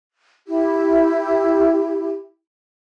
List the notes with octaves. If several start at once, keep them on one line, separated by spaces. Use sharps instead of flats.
E4 G4